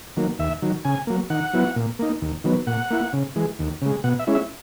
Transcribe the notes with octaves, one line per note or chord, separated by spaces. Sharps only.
D#3 F#3 A#3
D#2 E5
D#3 F#3
C#3 G#5
F#3 A#3
D#3 F#5
F#3 B3 E4
A#2
A#3 D#4
D#2
D#3 F#3 B3
A#2 F#5
A#3 E4
C#3
E3 G#3
D#2
C#3 G#3
B2 F#5
E5
G#3 C#4 E4
E5